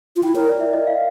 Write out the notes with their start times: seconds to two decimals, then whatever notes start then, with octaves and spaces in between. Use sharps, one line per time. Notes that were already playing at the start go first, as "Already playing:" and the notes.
0.16 F4
0.23 E4 G5
0.35 A#4 C#5
0.49 D5
0.61 E5
0.73 D#5
0.87 F5